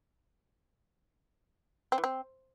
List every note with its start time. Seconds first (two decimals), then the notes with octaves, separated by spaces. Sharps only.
1.92 C4
1.98 E3
2.04 C4